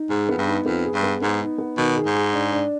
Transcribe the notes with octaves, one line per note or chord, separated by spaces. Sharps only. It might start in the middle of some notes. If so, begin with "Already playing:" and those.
Already playing: D#4
G#2 G#4
F2 B3
G2
D#4
F2 B3
G#4
G2
B3
G#2 B3
D#4
B3
B2 D#3
G#4
G#2
G#4
D4
D4